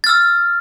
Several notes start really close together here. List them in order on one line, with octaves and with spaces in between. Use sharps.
A6 F6 E6